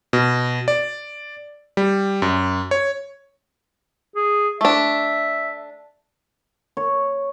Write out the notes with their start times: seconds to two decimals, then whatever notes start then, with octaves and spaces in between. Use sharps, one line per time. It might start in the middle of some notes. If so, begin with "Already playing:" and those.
0.13 B2
0.68 D5
1.77 G3
2.22 F#2
2.71 C#5
4.16 G#4
4.61 A3 D4 E5
6.77 C#5